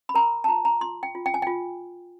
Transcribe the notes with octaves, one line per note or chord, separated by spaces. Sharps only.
B5
A#4 A#5
A5
F4 A#5
A#5
F4 C6
G5
F4
G5
G#5
F4 G5